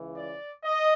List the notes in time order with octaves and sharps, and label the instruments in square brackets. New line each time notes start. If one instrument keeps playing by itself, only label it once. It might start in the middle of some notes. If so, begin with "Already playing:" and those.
Already playing: [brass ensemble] C#2 C#3 E3
D5
D#5